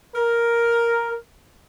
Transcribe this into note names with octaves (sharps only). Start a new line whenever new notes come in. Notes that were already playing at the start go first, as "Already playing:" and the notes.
A#4